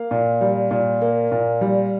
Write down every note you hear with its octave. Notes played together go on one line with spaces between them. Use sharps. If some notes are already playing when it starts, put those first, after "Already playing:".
Already playing: A#3 F5
A#2
G3
A#2
A#3
A#2
G3